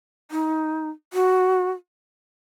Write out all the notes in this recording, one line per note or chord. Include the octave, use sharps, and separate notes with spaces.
D#4
F#4